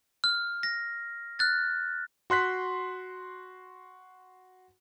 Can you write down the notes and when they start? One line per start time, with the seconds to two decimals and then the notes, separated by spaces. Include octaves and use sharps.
0.24 F6
0.63 A#6
1.39 F6 F#6 A6
2.30 F#4 C6 F#6 B6